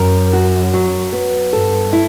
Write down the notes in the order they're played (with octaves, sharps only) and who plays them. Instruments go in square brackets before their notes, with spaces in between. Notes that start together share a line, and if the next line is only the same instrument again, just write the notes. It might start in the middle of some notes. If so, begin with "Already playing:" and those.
Already playing: [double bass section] F#2 [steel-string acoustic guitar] A#4
[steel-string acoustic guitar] F#4
F#3
B3
[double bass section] G2 [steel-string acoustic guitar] A4
[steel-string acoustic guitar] E4